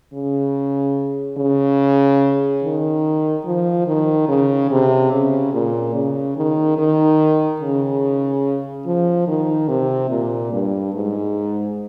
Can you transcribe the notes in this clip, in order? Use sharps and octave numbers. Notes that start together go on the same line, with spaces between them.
C#3
C#3
D#3
F3
D#3
C#3
C3
C#3
A#2
C#3
D#3
D#3
C#3
F3
D#3
C3
A#2
G2
G#2